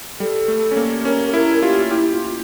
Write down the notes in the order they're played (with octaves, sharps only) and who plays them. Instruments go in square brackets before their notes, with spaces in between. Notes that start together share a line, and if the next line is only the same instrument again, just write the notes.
[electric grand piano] G3 [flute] A4
[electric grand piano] A3
C#4
A#3
[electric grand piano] C#4 [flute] A#4
[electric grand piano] E4 [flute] A#4
[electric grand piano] F4 [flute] G4
[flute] E4 [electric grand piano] G4
[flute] F4